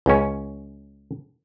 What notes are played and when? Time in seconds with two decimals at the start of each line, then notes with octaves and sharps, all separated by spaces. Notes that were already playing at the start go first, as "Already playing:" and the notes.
0.06 C#2 C#4